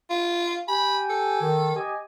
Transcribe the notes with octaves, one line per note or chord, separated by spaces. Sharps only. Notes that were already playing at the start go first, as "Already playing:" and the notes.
F4
G4 G5 G#5 B5
A4
D#3
G4 D#5 G#5